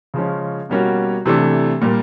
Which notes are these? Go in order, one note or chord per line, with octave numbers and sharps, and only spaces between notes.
C#3 F3 G#3 C#4
B2 G3 A#3 C#4 F#4
C3 E3 A3 D4
A#2 G3 A#3